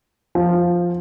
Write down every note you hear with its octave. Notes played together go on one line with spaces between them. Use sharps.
F3